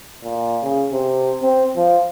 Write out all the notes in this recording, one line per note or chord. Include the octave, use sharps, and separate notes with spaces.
A#2
C#3
C3
C4
F3